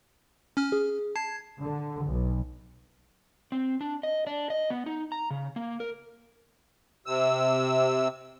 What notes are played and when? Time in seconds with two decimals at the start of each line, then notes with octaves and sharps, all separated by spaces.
0.57 C#4 F6
0.72 G#4
1.16 A5 G#6 C7
1.62 D3
2.09 B1
3.52 C4
3.81 D4
4.03 D#5
4.27 D4
4.50 D#5
4.70 B3
4.86 D#4
5.12 A#5
5.30 C#3
5.56 A#3
5.80 A#4
7.06 C3 E6